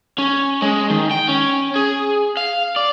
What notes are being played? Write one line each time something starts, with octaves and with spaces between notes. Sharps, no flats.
C#4
G#3
D#3
G5
C#4
G#4
F5
D5